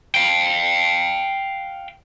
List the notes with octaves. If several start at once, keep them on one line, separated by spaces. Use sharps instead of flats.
F5 G5